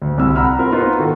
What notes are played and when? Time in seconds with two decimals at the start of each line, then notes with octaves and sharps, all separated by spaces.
0.02 D2
0.18 C2 C3 C4 E6
0.35 F#5 A#5 B5 E6 F6
0.59 C4 F4 A#4 B5
0.72 B3 D#4 F4 B4 C5
0.99 D#3 F4 F#4 A4